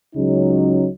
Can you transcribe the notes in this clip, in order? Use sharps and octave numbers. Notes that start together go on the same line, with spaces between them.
C#2 C#3 F#3 G#3 C#4 D#4